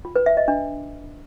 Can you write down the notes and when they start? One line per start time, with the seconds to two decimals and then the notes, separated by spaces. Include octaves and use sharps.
0.05 F4
0.16 B4
0.26 E5
0.37 D#5
0.48 D4